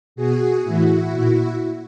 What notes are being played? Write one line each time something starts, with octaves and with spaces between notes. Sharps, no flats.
B2 F#4 G#4
A2 E3 E4 F#4
A#2